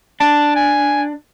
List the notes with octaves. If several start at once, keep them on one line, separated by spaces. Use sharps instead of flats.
D4 A5
G#5